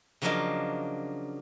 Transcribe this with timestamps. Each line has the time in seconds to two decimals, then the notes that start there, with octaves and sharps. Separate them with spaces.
0.22 C#3 F3 F#3 A#3 D4 D#5